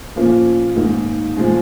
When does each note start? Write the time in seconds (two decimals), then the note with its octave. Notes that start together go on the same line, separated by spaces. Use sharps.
0.16 A#2 F3 A#3 C#4
0.76 G#2 D#3 A#3
1.36 A#2 F3 G#3 C#4